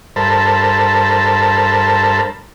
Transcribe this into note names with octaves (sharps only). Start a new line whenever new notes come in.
G2 A4 A#4 C5 A5 B5